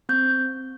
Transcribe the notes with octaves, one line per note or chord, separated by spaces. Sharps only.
C4 G6